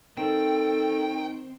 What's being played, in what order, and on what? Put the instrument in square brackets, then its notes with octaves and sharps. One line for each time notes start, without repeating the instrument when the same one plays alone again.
[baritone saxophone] D#3 [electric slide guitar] C4 [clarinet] A4 [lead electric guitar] G5